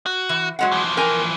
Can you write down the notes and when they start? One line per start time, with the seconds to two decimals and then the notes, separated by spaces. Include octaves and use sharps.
0.06 F#4
0.29 E3
0.59 F#3 G#3 F#5
0.72 E3 F3
0.97 A#4 G5 G#5